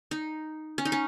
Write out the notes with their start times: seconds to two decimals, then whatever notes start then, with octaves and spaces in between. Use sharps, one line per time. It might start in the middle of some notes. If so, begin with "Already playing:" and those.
0.11 D#4
0.78 C#4
0.85 D#4
0.92 C#4